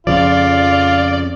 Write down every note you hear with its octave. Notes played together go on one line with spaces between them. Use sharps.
F2 C#3 F3 F4 D5